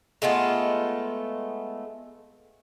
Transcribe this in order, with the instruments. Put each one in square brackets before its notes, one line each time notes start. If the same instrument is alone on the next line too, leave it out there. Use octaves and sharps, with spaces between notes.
[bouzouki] G#3 A3 B3 F4